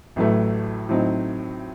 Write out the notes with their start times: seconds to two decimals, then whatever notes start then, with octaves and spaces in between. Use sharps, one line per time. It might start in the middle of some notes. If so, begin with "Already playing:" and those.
0.16 A1 A2 F#3 A3
0.89 A2 F#3 C4 D#4